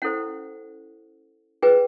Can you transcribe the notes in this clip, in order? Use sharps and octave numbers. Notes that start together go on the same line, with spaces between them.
C#4 E4 A4 C5 F#5
F4 G#4 B4 G5